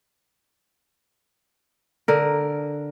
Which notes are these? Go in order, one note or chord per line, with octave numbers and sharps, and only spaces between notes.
D3 A#4